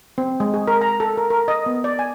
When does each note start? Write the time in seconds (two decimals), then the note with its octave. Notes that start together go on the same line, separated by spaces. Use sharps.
0.18 C4
0.40 G#3
0.54 G#4
0.68 A#4
0.81 A#5
1.00 A4
1.18 A#4
1.30 A#4
1.48 D#5
1.66 B3
1.84 D5
1.99 G#5